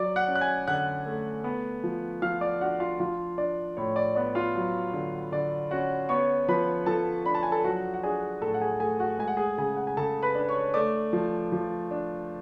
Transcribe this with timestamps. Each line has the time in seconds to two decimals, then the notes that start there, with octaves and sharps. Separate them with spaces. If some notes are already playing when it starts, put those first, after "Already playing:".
Already playing: F#3 D5 D6
0.16 F#5 F#6
0.28 C#4
0.35 F#6
0.41 G#5 G#6
0.67 D3 F#5 F#6
1.06 A3
1.44 B3
1.84 F3
2.22 F3 F5 F6
2.41 D5 D6
2.61 D4 F#4 F#5
2.80 F4 F5
2.99 F3 F4 F5
3.38 D4 D5
3.77 A2 C#5
3.96 D5
4.15 B3 D5
4.35 F4 F5
4.55 F#3
4.93 D3
5.32 D3 D5
5.71 C#4 F#4 F#5
6.09 B3 C#5 C#6
6.48 F3 B4 B5
6.86 F3 A4 A5
7.26 D4 B5
7.35 A5
7.43 G#5
7.52 A4 A5
7.64 F#3 F#4 F#5
7.94 F#5
8.03 D4 G#4 G#5
8.42 A2 A4 A5
8.54 F#5
8.61 G#4 G#5
8.80 A3 G#4 G#5
9.00 F#4 F#5
9.19 G#3 G#5
9.28 F#5
9.37 G#4 G#5
9.58 C#3 G#4 G#5
9.76 F#5
9.87 G#5
9.97 C#3 A4 A5
10.22 B4 B5
10.35 D4
10.48 C#5 C#6
10.74 A3 D5 D6
11.13 F3
11.52 F3
11.91 D4